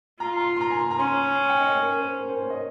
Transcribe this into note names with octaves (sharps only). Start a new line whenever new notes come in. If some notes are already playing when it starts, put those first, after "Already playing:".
F4 A#5
C6
C6
A#5
G#5
C6
A#5
C#4 C6
G#5
G5
D#5
C#5
A#4
C5
A#4
C5
C#5
D#5